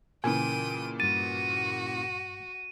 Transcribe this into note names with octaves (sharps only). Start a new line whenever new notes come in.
A#2 C#3 E3 G5 G#5 D#7
G2 F#4 A6 D#7